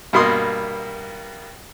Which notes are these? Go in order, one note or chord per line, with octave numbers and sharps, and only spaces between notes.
G2 B2 A#3 C6 D#6